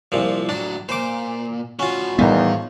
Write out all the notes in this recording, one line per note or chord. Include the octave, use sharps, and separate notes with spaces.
C2 A#2 F3
A2 F#3 D4
A#2 C5 D6
A2 C#4 F4 F#4
E2 A2 D#3 G3 B3 C5 F5